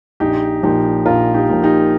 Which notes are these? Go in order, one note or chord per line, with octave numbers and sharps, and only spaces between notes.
A#1 D#4 G4
A#2 F3 D#4 G4
A#1 F4 A#4
D#4 G4
A#2 F3
D#4 G4